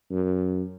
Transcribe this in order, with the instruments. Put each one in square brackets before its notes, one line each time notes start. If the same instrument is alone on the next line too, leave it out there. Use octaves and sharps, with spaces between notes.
[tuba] F#2